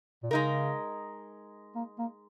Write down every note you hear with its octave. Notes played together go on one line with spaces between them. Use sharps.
A#2
C#3 G#3 D#4 A#4
A#3
A#3